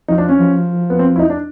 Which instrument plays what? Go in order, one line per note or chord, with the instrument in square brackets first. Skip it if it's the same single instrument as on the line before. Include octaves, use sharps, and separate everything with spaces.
[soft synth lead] F3 [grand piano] D#4
[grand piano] D4
C#4
[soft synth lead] F3
[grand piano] B3
C4
E4
D#4
D4